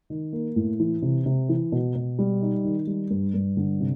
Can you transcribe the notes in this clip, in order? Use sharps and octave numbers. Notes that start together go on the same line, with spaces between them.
D#3
A#3
A2
E3
C3
C3
E3
B2
B2
G3
D#4
D#3
G3
G2
G2
D3
C3